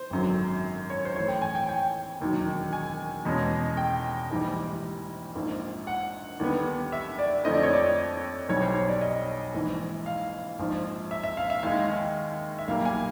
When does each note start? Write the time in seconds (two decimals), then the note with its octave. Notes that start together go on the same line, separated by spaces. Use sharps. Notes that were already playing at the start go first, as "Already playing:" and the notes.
Already playing: C5
0.10 G#1 F#2 D3 F#3
0.90 C#5
1.05 C5
1.16 A2 E3 A3 C#5
1.28 G5
1.42 G#5
1.55 G5
1.69 G5
2.21 E1 D#2 D#3 F#3
2.73 G#5
3.25 E2 B2 G#3 C#4
3.77 G5
4.30 A#1 G#2 E3 G3
5.35 A#1 G#2 F3 A#3
5.87 F#5
6.39 D#2 D3 G3 B3
6.92 E5
7.19 D5
7.44 F2 D3 F3 A3 C4 D#5
7.54 D5
7.63 C#5
7.73 D5
8.49 B1 B2 G3 C#5
8.62 C5
8.76 C#5
8.88 D5
9.01 D#5
9.54 A#1 G#2 E3
10.06 F5
10.59 A#1 G#2 F3
11.11 E5
11.24 E5
11.37 F5
11.50 E5
11.63 D#2 D#3 G#3 F5
12.59 E5
12.68 B1 A#2 G3 A#3 F5
12.85 G#5